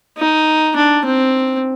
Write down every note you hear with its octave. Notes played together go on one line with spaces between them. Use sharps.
D#4
D4
C4